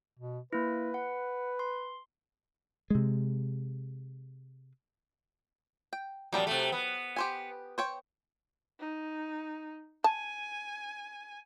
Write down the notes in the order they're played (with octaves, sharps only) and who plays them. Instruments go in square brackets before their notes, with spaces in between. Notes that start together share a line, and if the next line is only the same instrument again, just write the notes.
[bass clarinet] B2
[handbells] A#3 E4 [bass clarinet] B4
[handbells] F#5
C6
[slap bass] C3 G#3
[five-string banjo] G5
[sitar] F2 A#2 G3 [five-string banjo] F#3 G4 A5
[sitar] C3 A3
B3
[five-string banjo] G4 C5 G#5
C5 C#5 G5
[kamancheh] D#4
[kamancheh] G#5 [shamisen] A5